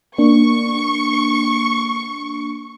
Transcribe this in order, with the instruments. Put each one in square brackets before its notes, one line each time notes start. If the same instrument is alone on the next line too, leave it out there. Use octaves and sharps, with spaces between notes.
[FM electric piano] A#3 D4 [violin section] C#6